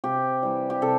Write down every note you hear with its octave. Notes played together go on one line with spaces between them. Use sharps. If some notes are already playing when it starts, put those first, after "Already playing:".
C3 G4
E3 G3
G4
C3 A4